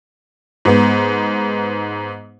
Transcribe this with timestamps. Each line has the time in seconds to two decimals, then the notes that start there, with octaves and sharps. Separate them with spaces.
0.65 G#2 B3